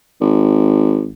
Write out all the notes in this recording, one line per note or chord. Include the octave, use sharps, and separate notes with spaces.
G#1